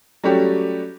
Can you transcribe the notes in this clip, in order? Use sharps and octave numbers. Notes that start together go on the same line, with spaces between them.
F#3 G3 A3 C#4 G4